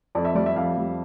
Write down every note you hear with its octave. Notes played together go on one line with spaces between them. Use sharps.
F2 D5
E5
G3 D5
E5
F2 F5
G3